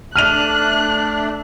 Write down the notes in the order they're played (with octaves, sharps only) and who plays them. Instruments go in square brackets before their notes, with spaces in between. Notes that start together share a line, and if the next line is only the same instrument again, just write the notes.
[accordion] A3 D4 [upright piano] F6 D#7 F7 [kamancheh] F#6